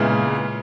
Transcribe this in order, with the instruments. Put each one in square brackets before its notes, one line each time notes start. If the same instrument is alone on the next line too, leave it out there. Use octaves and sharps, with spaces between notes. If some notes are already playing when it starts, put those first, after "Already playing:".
Already playing: [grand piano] A#2 C#3 [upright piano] G#3 B3 E4 G#4